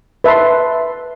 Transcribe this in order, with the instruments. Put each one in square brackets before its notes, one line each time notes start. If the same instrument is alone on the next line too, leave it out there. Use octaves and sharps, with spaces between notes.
[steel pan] B4 E5 A5 C6